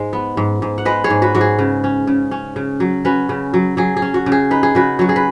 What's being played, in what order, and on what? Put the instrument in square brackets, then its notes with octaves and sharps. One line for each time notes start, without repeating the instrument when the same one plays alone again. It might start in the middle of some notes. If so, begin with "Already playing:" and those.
Already playing: [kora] G#2 G#3
B3
G#2
G#2
F#5
G#3 B4 D#5
G#4 C#5
G#2
F#4 B4
G#2 F#4
G#4
C#3
C#4
C#3
C#4
C#3
F#3
C#4 F#4 B4
C#3
F#3
F#3 G#4
G#4
C#4
F#4
C#3
G#4
D#4 B4
G#4
C#3 F#4 B4
F#3 F#4
G#4
B4